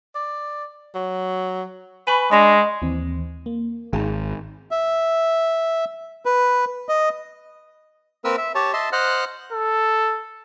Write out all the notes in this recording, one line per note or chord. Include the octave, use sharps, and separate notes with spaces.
D5
F#3
B4 G#5 B5 C#6
G#3 D4 D#5 A#6 F7
D#2 E3 C4
A#3
G#1 G#4
E5
B4
D#5
A#3 C4 A#4 B4 E6
E5
G4 C#5 A5
D#5 E5 A5 C6
C5 D#5 F#5 F6 F#6
A4